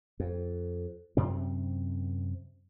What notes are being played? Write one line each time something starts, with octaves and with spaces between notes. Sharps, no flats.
F2
F#2 C3 C4